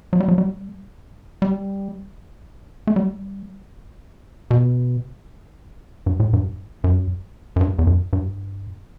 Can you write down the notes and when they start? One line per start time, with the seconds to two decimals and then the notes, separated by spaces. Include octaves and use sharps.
0.13 F#3
0.20 G3
0.28 F#3
0.38 G3
1.42 G3
2.87 A3
2.96 G3
4.51 B2
6.06 G2
6.20 A2
6.33 G2
6.84 F#2
7.56 F#2
7.61 G2
7.79 E2
7.87 F#2
8.13 G2